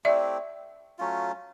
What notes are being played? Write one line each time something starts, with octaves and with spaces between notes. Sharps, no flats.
A3 C4 E4 G4 D5 E5
F#3 A3 C#4 F4